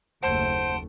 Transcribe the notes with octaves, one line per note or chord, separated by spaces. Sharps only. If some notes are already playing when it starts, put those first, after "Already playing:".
F#1 D#2 A3 C5 F#5 A5 C6 D7